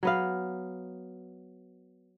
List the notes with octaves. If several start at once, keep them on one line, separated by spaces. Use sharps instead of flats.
F#3 B3 F5